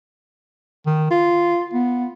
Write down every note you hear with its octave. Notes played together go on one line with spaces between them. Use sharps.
D#3
F4
B3